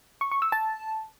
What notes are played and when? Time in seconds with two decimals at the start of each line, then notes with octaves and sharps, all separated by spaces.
0.21 C#6
0.32 C#6
0.42 E6
0.52 A5